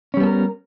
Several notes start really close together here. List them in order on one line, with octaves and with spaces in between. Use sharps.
C#4 G3 B3 A4 A#4